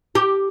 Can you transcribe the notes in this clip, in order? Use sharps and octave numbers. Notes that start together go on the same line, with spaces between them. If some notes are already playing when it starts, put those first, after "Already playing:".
G4